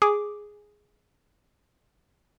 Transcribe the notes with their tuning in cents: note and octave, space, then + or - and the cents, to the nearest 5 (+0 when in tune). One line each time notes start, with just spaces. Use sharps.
G#4 +0 D6 +0